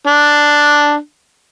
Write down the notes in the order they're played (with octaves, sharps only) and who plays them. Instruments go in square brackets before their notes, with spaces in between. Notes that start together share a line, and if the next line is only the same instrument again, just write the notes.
[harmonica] D4